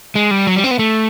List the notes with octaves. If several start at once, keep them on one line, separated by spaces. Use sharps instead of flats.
G#3
G3
F#3
G3
C4
B3
A3